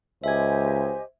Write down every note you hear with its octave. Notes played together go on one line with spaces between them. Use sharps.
C#2 G4 C5 D#5 E5 G#5 G#6